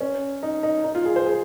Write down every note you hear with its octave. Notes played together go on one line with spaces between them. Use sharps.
C#4
D#4
D#4
D#4
F4
G#4
C5
G#4